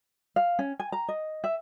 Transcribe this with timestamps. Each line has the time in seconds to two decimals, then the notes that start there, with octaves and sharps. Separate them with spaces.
0.36 F5
0.59 C#4
0.80 G#5
0.92 A#5
1.08 D#5
1.44 E5